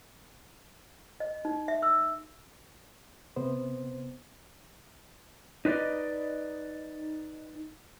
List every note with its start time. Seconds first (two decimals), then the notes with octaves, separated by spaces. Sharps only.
1.20 D#5
1.45 D#4
1.68 E5
1.82 E6
3.36 C3 B3 C5
5.65 D#4 B4 C5 D5 D#5